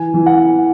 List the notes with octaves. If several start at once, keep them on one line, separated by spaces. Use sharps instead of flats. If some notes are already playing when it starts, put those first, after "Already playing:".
Already playing: E3 G#5
E3
F#5